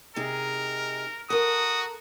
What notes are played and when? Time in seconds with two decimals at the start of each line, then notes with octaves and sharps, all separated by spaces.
0.16 C3 D#4 G#4 A#4
1.30 F#4 A4 A#4 D#6